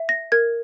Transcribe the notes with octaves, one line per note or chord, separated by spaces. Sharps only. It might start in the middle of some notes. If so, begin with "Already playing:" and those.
Already playing: E5
A#6
A#4 G#6